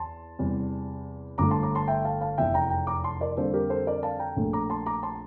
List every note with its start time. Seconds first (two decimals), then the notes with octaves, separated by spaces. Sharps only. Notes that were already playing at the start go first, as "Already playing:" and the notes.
Already playing: E2 A5 C6
0.39 E2 C3 G3
1.38 G1 G2 D3 A3 A#5 D6
1.51 A5 C6
1.63 A#5 D6
1.75 A5 C6
1.88 E5 G5
2.04 F5 A5
2.21 F5 A5
2.38 F1 E2 E3 E5 G5
2.54 G5 A#5
2.70 G5 A#5
2.87 A#5 D6
3.04 A5 C6
3.21 A#4 D5
3.37 F2 D3 G3 A#3 A4 C5
3.53 G4 A#4
3.70 A4 C5
3.87 A#4 D5
4.03 F5 A5
4.19 G5 A#5
4.36 A#1 A#2 A3
4.53 A#5 D6
4.70 A5 C6
4.86 A#5 D6
5.03 A5 C6